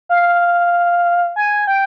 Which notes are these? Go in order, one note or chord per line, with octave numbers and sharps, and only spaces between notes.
F5
G#5
G5